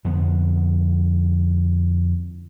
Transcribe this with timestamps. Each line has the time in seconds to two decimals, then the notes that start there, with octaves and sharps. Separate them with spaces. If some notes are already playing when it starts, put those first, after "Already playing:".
0.05 F2 D3 B3